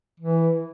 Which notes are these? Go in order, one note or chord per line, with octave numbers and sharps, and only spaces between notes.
E3